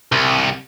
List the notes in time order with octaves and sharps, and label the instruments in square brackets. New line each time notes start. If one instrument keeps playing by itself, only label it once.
[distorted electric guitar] C2